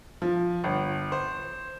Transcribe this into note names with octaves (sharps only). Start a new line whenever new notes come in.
F3
G1
C5